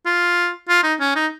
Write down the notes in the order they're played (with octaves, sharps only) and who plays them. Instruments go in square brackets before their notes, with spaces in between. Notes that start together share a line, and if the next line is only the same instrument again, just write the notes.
[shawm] F4
F4
D#4
C#4
D#4